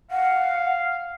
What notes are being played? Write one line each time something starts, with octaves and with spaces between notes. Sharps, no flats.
F5 F#5